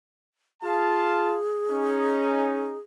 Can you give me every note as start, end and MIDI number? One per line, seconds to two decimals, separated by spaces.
0.63 1.38 65
0.63 2.79 68
0.63 1.38 77
0.63 1.38 81
1.69 2.76 61
1.69 2.76 63